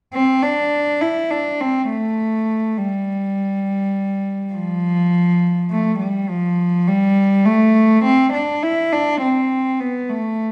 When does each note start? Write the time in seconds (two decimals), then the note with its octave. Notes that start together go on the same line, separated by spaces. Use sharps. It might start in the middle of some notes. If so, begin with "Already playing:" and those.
0.14 C4
0.43 D4
1.01 E4
1.31 D4
1.61 C4
1.90 A3
2.78 G3
4.53 F3
5.71 A3
6.00 G3
6.29 F3
6.87 G3
7.46 A3
8.05 C4
8.34 D4
8.63 E4
8.93 D4
9.22 C4
9.80 B3
10.10 A3